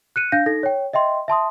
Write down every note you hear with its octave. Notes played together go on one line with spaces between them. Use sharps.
F#6 C#7 D#7
D4 F5 G6 A#6
D#4 A4 A#6
C#5 G5
D#5 E5 G5 C6
E5 A5 C6 D#6